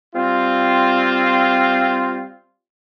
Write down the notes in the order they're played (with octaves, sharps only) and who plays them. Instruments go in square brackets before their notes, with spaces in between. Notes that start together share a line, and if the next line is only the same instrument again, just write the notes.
[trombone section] G3 C4 F4